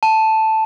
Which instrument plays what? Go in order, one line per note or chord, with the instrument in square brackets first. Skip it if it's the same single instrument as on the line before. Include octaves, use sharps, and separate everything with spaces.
[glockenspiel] A5